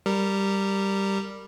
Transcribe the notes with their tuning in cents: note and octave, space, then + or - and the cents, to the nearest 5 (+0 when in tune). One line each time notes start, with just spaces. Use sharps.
G3 +0 A#4 -15